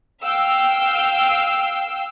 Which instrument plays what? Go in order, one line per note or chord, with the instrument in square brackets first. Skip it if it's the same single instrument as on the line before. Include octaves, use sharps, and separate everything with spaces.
[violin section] F5 G5 E6